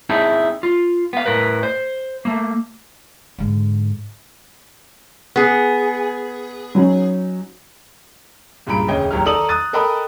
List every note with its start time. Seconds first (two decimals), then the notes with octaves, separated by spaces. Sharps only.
0.09 C4 D#4 E4 G#4 A5
0.63 F4
1.13 B3 F5
1.26 A2 A#4 B4
1.63 C5
2.25 A3 A#3
3.38 G#2 D3
5.36 B3 G#4
6.75 F#3 C#4 D#4
8.66 C#2 G2 A#2 B5 D7
8.88 E1 D2 C#3 C#5 D#5 G5
9.11 G#1 D#2 D#3 F#3 G4 F6
9.25 D#3 D#4 A4 D5 D#6 F#7
9.49 D#6 F#6 A6 D#7
9.73 A4 A#4 D#5 G5 B5 D#6